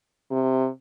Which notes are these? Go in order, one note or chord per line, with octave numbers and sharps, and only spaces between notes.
C3